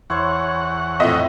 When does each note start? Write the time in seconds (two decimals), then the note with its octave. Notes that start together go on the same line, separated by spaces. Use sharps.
0.10 E2 E4 C5 C#5 F#5 C#6
1.00 F2 A2 D#5 E5